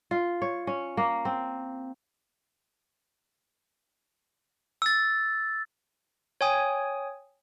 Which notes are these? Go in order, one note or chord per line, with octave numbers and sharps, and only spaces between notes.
F4
C#5
C#4
A#3
C4
E6 A6
C#5 G5 G#5 D#6